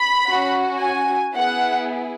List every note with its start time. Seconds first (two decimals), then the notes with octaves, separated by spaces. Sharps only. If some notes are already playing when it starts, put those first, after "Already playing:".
Already playing: B5
0.27 C#4 F#4
0.81 G#5
1.34 B3 E4 G#4 F#5